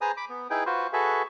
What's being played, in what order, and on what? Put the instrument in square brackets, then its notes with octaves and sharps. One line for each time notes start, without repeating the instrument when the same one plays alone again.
[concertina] G#4 B4 C5 G#5 A#5 D#6
B5 D6
B3
D#4 E4 G#4 B4 G5
F4 F#4 B4 C5
F#4 G#4 A4 B4 E5